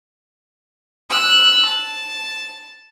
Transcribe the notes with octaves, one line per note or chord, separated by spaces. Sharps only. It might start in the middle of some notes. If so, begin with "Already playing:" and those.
E6 F#6
A5